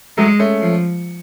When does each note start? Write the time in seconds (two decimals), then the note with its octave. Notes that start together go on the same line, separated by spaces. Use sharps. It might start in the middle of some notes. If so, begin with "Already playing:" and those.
0.18 F#3 G#3 A3
0.39 A3 C#4
0.61 F3